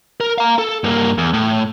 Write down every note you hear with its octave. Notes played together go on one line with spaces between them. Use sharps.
A#4
F5 A#5
A4
G2 A#3
E2
A2